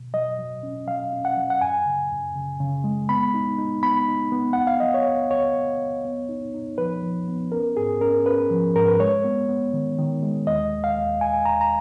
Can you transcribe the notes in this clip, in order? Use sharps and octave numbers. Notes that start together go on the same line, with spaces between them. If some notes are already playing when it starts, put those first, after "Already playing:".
Already playing: B2
F#3 D#5
F#3
C#4
F#3 F5
C#4
F#5
F#3
F#5
F#2 G#5
C#3
F#2
C#3
C#3
G#3
B3 B5
D#4
D#4
B3 B5
D#4
B3
C#2 F#5
F5
F#3 D#5
C#5
C#2
C#2 C#5
C#2
C#2
B3
D#4
D#4
F3 B4
F3
B3
C#4 A#4
G#2 G#4
C#4 A#4
C#4 B4
F3
G#2 A#4
B4
G#3 C#5
B3
B3
D#3
D#3
G#3
D#2 D#5
D#2
F5
D#2
D#2 G#5
D#2 A#5
A#5